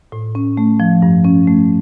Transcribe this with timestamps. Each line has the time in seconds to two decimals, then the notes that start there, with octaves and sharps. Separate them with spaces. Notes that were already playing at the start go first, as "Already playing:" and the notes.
0.12 A2
0.35 C#4
0.57 A3
0.80 F3
1.02 G2
1.25 C#4
1.47 A3